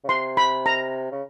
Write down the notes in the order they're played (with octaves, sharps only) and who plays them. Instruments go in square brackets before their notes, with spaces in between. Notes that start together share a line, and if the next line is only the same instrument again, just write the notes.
[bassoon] C#3
[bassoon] C3 [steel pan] C6
[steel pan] B5
A#5
[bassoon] C#3